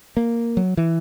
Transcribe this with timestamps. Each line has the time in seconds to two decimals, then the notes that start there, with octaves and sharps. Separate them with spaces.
0.17 A#3
0.57 F#3
0.77 E3